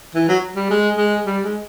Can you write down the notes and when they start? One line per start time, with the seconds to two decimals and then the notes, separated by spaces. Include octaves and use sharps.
0.15 E3
0.28 F#3
0.56 G3
0.70 G#3
0.97 G#3
1.25 G3
1.43 G#3